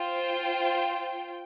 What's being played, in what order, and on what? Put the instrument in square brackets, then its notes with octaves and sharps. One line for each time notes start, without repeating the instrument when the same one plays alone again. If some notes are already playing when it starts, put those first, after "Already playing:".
Already playing: [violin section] F4 C5 G5